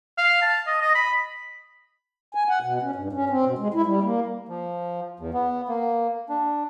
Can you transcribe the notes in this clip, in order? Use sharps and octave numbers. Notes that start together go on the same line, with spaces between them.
F5
A5
D#5
D#5
B5
G#5
F#5
B2
C#4
G2
C#4
C4
B2
G#3
E4
G3
A#3
F3
E2
B3
A#3
D4